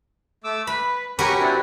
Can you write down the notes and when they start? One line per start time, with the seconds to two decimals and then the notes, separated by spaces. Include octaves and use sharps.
0.44 A3 D6 E6
0.67 B4 B5
1.19 C#4 F#4 G4 A#4 B4 C#6
1.40 C4 D4 E4